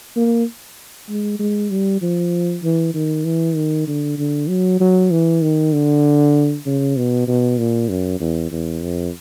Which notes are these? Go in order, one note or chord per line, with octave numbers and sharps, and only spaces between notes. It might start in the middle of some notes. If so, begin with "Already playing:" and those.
A#3
G#3
G#3
G3
F3
E3
D#3
E3
D#3
D3
D3
F#3
F#3
E3
D#3
D3
C#3
B2
B2
A#2
F#2
E2
E2
F2